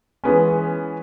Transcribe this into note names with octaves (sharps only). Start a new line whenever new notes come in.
E3 G#3 B3 C#4